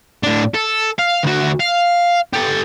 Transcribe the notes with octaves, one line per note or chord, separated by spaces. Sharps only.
A2 D4
A4
F5
D2 F#4
F5
G4 A4